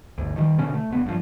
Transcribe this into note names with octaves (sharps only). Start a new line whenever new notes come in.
G1 D2
D#3 F3 G3
B2 D3 C#4
A3
F#1 B3
G2 B2 F3